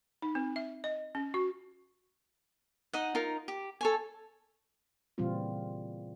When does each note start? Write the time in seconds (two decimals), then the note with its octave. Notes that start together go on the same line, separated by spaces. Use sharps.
0.22 D#4
0.35 C4
0.56 E5
0.84 D#5
1.15 C#4
1.34 F#4
2.93 D#4 D#5 F#5
3.15 D#4 F4 A#4
3.48 G4
3.81 A4 C#5 G#5
5.18 A#2 C#3 E3 G3 C4 F4